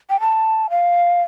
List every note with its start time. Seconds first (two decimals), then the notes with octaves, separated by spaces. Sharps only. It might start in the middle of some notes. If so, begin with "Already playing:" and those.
0.10 G5
0.20 A5
0.70 F5